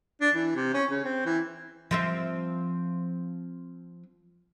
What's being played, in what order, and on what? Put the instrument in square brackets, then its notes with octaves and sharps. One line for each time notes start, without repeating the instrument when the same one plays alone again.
[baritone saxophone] D4
E3
C3
C#4
C#3
C4
E3
[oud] F3 C4 E5